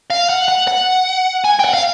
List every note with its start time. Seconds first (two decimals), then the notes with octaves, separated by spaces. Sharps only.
0.10 F5
0.29 F#5
0.48 F#5
0.68 F#5
1.44 G#5
1.59 G5
1.64 F#5
1.74 F5